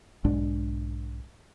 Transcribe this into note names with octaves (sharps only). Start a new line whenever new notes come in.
B1 G#2 G#3 D4